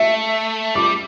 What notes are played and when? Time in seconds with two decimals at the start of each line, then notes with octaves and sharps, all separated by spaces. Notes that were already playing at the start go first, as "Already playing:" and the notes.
Already playing: A3 E5
0.74 G3 D6